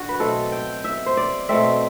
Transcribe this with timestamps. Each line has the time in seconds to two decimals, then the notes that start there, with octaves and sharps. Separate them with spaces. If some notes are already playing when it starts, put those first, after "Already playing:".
Already playing: D3 F#4
0.09 B4
0.20 B2 F#3 A3 C4 A4
0.52 G5
0.84 E5
1.06 C5
1.17 D5
1.49 B2 A3 C4 E5